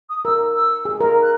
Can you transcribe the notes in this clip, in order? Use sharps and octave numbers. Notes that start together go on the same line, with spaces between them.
D#6
A#4 E6
E6
G#4
A#4
F#6